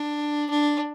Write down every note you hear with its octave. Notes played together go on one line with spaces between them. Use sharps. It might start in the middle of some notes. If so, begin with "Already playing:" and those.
Already playing: D4
D4